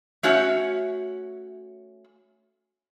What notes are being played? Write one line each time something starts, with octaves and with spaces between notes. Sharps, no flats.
A3 C#4 F#4 C#5 E5